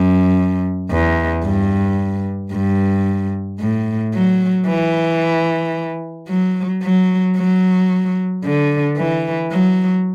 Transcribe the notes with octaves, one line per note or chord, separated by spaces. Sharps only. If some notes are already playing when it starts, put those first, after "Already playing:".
Already playing: F#2
E2
G2
G2
A2
F#3
E3
F#3
F#3
F#3
D3
E3
F#3